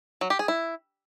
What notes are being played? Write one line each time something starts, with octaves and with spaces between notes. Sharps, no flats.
F#3
G4
G#4
E4